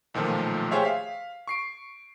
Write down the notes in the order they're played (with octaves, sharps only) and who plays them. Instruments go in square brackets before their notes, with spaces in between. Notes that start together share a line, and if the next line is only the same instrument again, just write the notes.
[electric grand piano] B1 A#2 D#3 F3 A3
G4 G#4 C5 C#5 E5 F5
F5 B6
C#6 C7 D7